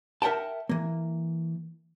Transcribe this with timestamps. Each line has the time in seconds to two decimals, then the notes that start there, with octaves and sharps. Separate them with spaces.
0.22 A#4 E5 F#5 G5 A5
0.69 E3 A#3